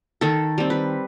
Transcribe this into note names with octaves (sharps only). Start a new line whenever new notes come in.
D#3 A4
G3 C4
B4